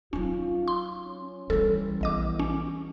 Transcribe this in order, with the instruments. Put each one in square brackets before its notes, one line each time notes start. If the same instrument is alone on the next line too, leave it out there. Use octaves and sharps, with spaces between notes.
[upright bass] F#3 D#4 [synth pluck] C#4 [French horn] F4
[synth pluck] C6
[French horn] C#4
[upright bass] E3 G3 [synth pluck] A4
[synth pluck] A#1 D#5 D6 [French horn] E2
[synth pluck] C#4